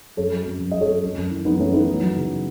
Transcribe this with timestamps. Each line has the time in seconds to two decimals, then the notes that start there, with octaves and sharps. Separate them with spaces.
0.17 F#2 A4 C#5
0.31 F#3
0.46 F#2
0.60 F#2
0.71 F#3 D#5
0.81 A4 C#5
0.88 F#2
1.03 F#2
1.16 F#2
1.31 E3
1.45 F#2 B3 D#4
1.59 F#2 A3 C#4
1.73 E3 B3 D#4
1.88 F#3
2.01 F#3
2.16 C#3